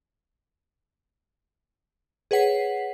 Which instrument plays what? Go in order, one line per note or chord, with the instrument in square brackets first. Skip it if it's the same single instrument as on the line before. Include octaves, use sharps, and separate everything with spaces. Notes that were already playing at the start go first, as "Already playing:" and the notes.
[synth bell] G#4 B4 C#5 F#5 B6 C7